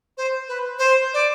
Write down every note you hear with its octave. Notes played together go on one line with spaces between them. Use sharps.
C5
B4
C5
D5